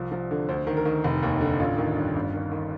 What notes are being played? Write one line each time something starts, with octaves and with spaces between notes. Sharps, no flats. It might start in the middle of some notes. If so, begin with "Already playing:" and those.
Already playing: C2 F3
F3
D3
D2 C5
D#3
A#4
D#3
F1
D#2
D3
A1 F4
D#3
G2
G1
D#3
D#3